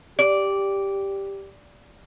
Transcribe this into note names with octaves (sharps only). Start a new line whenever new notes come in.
G4 D5